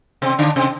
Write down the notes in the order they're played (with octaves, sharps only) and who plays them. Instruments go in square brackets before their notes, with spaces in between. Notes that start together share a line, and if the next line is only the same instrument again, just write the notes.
[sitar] C3 C4
D3 D4
C3 C4